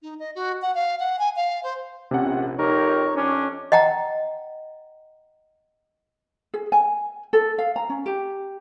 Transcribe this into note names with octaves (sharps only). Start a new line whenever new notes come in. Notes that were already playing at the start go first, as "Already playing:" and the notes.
D#4
D#5
F#4
F#5
F5
F#5
G#5
F5
C5
A#1 C3 C#4 F#5
F2 D#4 G4 A#4 C#5
F2 C#4 D4
D#5 F#5 G5 A#5
G#4
G#5
A4
F5
A#5
C#4
G4